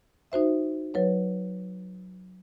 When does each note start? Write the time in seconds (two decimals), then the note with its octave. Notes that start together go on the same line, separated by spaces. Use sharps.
0.32 D#4 F#4 C5 E5
0.94 F#3 B4 C#5